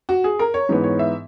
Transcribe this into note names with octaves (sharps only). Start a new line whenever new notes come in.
F#4
G#4
A#4
C#5
G#2 E3 B3
C#5
E5